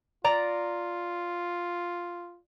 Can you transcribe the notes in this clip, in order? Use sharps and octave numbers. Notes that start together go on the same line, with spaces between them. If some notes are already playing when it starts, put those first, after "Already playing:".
F4 D5 A#5 A6